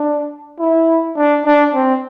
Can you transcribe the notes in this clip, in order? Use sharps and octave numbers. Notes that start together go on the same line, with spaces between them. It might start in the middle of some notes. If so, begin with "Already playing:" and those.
Already playing: D4
E4
D4
D4
C4